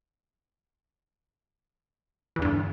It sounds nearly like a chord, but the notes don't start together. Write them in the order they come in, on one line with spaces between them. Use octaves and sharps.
E3 E2 D3 G2